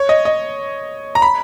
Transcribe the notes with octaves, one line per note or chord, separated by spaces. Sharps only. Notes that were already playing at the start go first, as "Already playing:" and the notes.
Already playing: C#5
D#5
D#5
A#5
B5